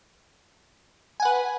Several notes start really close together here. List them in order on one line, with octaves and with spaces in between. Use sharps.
G#5 F#5 B4